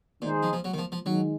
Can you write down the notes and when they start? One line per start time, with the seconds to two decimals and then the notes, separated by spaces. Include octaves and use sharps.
0.22 A#2 D#3 G#3 D#4 G#4 C5
0.43 F3
0.53 F3
0.64 F#3
0.74 D#3
0.78 F3
0.92 F3
1.06 D#3 F#3 G#3